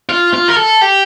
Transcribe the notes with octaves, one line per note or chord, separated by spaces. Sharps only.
F4
F4
A#4
A4
G4